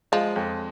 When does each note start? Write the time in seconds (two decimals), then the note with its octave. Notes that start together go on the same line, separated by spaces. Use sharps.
0.12 F3 G#3
0.36 F2